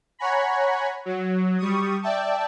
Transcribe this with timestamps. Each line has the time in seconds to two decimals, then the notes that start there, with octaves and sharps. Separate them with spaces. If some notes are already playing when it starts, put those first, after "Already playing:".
0.19 C#5 F#5 G#5 A#5 B5
1.05 F#3
1.58 G3 C#6 D#6
2.02 D5 E5 G5 A5